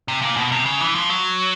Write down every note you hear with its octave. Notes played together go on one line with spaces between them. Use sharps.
C3
A#2
B2
C3
C#3
E3
F3
F#3